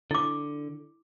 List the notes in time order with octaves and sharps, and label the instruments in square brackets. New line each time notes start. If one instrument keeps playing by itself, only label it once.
[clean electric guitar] D3 [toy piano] E4 D6